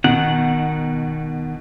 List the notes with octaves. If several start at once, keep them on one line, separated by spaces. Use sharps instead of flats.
B2 D#3 F#5